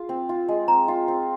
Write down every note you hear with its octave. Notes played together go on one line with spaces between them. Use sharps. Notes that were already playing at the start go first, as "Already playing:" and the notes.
Already playing: F4 G#4
C4
F4
G#3
C4 A#5
F4
C4